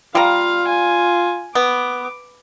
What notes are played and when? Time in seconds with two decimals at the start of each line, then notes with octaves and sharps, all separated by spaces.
0.15 G3 F4 F5 A#5
0.68 G#5
1.55 B3 D6